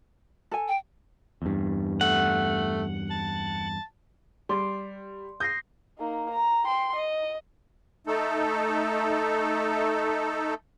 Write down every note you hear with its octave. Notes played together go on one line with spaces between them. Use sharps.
A4 G#5
G5
E2 G2
A3 F#5
A5
G3 D5 C6
D#6 G6 A#6 C7
A#3 D#4
A#5
G5 C6
D#5
A3 D#4 A4